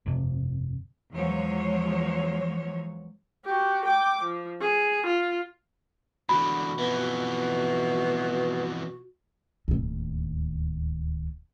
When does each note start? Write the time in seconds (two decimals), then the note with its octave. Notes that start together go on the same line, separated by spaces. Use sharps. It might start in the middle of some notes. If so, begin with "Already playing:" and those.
0.06 G1 F2 C3
1.12 E2 F3 F#3 G#3 C#5
3.45 F#4 G4
3.86 G5 D6
4.23 F3
4.61 G#4
5.06 F4
6.29 E2 D3 F#4 B5
6.78 F2 B2 E3
9.68 D1 D#2